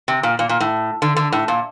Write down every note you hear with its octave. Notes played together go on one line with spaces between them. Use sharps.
C3
A#2
A#2
A#2
A2
D3
D3
A2
A#2